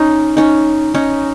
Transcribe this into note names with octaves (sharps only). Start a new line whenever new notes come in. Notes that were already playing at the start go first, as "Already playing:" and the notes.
Already playing: C#4 D#4
C#4 D#4
C#4 D#4